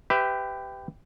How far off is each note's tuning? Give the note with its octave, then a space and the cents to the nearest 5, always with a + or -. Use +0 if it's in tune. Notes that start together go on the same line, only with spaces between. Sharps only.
G4 +0 B4 +30 E5 -5